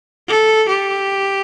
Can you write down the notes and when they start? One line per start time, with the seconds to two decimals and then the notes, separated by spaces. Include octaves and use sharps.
0.28 A4
0.68 G4